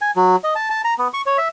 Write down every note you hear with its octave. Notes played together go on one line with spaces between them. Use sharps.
G#5
F#3
D#5
A5
A5
A#5
B3
C#6
C#5
E5